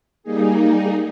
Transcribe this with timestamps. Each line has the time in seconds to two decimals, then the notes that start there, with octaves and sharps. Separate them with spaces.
0.23 G3 A#3 D#4 G#4